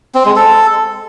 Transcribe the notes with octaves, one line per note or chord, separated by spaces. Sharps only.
C4
G#3
A4